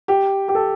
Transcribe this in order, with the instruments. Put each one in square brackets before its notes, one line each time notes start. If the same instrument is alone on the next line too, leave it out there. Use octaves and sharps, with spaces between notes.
[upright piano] G4
G4
A4